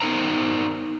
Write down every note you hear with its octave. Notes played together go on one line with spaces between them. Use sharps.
B3 D#4 A#4 C5 A#5